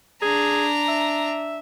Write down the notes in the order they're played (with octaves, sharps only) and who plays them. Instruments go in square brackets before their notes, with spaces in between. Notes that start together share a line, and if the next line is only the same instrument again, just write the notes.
[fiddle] D4 A#5 [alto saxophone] G#4
[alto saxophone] E5